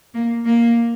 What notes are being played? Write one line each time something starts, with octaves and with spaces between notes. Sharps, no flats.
A#3
A#3